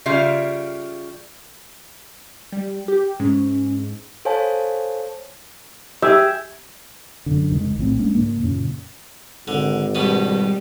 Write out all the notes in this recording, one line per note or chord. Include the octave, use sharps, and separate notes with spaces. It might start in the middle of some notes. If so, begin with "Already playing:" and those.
C#3 G3 F4 E5 F5
G3
G4
G#2 C#4
A4 C5 C#5 F5 G#5 A5
G4 G#4 E5
F#2 A2 D3
F1 C#2 D#3 G#3
A#1 A2 C4
G#3 A#3 C#4 D4
C#2 G#2 A#3
F#2 A#2 C#3
G#1 D3
G2 B2 G3 B3